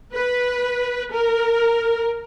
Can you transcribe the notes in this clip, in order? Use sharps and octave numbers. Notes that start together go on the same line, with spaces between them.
B4
A#4